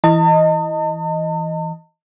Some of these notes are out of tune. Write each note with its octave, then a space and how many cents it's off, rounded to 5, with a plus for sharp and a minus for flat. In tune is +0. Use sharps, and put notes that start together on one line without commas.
E3 +0 D#5 +0 A5 +45